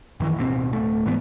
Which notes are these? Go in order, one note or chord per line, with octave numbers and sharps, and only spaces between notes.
F#2 D#3 E3
D1 B2 A#3 C4
D1 E2 A3
G#2 E3 B3